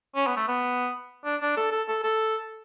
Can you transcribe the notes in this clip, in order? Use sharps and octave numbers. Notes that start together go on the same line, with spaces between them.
C#4
B3
A3
B3
D4
D4
A4
A4
A4
A4